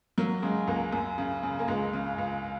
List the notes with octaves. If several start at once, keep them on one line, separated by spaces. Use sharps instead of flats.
F#3 A#3
C#3 G#3
C#2 A#3
F#2
C#3
C#3
A#3
C#2 G#3
C#3
C#2